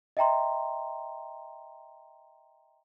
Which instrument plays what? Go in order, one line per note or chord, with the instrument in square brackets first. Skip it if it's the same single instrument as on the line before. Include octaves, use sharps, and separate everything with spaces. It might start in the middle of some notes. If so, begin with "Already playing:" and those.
[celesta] D#5 E5 G5 A#5 C6